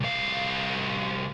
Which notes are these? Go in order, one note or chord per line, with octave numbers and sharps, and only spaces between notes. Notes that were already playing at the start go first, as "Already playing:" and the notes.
C2 F5